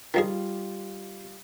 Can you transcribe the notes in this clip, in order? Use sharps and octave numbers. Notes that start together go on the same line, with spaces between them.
D#3 F3 G3 F4 G#4